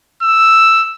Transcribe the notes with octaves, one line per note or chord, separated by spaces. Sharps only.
E6